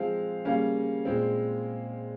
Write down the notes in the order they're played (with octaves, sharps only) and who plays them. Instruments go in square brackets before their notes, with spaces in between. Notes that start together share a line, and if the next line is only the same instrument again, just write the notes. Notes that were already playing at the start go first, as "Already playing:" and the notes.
Already playing: [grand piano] F3 G#3 C4 F5
C#3 G3 A#3 C#4 F5
A#2 G#3 C4